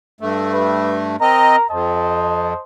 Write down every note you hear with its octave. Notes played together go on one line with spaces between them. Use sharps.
G2 A3
G4 B4
C4 A#4 D#5 A#5
F2 C5 D#5 A5